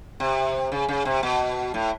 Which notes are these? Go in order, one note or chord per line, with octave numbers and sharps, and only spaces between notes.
C3
C#3
C#3
C3
B2
A2